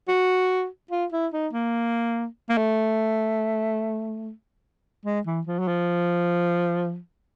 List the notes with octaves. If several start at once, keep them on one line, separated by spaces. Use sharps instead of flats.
F#4
F4
E4
D#4
A#3
A#3
A3
G#3
E3
F3
F#3
F3